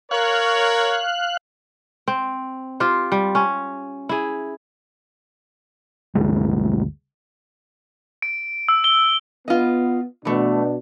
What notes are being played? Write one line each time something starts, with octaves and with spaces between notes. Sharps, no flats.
A#4 C#5 F5 F#6
C4
F4 G4 C5
G3
C#4
E4 G#4
G1 D2 G#3
D7
E6
G7
B3 F4 D#5
B2 E3 A3 D4